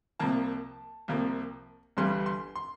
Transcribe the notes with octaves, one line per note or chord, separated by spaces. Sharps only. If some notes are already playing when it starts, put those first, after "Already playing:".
C2 C3 F3 A#3 A5
C2 C3 F3 A#3
G1 G2 E3 G3 C6
C6
C6